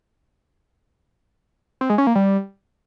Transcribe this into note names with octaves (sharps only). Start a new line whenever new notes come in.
C4
G#3
C#4
A#3
G3